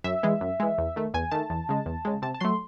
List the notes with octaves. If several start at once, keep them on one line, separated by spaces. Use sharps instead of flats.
F#2 E5
E3 G#3
F#2
E3 G#3
E2
D#3 A3
E2 G#5
D#3 A3 A5
E2
C#3 G#3
E2
C#3 G#3
C3 A5
A5
F#3 A3 C6